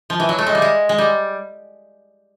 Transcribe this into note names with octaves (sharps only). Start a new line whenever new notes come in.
F3
E3
F#3
A3
G#3
G3
G#3
G#3
G3